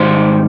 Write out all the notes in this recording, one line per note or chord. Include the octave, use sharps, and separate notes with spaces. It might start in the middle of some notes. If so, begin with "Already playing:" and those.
Already playing: G#2 D#3 G3 C5